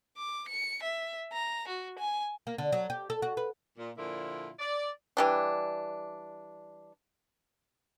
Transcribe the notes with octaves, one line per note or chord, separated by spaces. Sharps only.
D6
C#7
E5
A#5
F#4
G#5
A#3
D3
F#3
G4
A4
F#4
B4
A#2
A#2 D3 F3 A#3 E4 F4
D5
E3 G3 D4